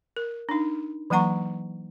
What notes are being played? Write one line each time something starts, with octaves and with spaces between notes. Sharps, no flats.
A#4
D4 D#4
E3 F#3 A#3 F#5 A#5 C#6